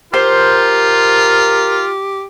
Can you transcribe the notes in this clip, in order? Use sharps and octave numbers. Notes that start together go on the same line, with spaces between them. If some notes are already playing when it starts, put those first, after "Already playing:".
F4 G4 A#4 C5